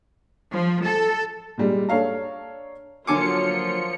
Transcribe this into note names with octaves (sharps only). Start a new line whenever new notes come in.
F3
A4
A#2 D3 G3 G#3
D4 A4 C#5 F5 A#5
D3 F3 F#3 A#3 F4 G#5 D6 C#7